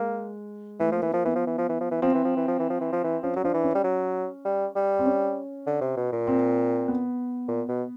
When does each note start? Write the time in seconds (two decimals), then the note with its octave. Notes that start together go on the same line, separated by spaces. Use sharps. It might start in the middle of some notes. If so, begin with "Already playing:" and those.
Already playing: G#3 A#3
0.80 E3 A3
0.92 F3 A#3
1.02 E3
1.10 F3 A#3
1.25 E3 B3
1.35 F3
1.47 E3
1.58 F3
1.69 E3
1.81 F3
1.91 E3
2.02 F3 C4
2.14 E3
2.25 F3
2.37 E3
2.48 F3
2.59 E3
2.70 F3
2.81 E3
2.92 F3
3.04 E3
3.23 F3 C#4
3.36 F#3
3.44 F3 D4
3.54 E3
3.64 C#4
3.75 G3
3.84 F#3
4.45 G3
4.76 G3
4.99 C4
5.06 C#4
5.67 D3
5.81 C3
5.97 B2
6.12 A#2
6.27 C4
6.88 B3
7.48 A#2
7.69 B2